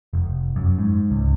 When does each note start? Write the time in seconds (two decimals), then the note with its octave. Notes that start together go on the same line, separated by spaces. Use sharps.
0.13 F1
0.56 F#2
0.78 G#2
1.11 C#2